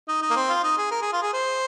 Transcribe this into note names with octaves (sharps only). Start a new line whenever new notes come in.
D#4
D#4
A#3
C4
F4
D#4
G#4
A#4
G#4
F4
G#4
C5